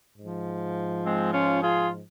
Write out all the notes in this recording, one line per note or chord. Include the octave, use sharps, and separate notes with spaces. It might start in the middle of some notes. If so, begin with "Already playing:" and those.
G#2 F3
G#3 C4
C#4 F4
F4 G#4